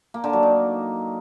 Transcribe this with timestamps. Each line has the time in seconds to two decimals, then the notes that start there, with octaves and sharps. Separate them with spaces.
0.14 A#3
0.24 D3
0.33 F#3
0.43 D#4